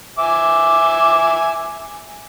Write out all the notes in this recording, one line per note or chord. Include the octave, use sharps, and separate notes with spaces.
E5 G#5 D6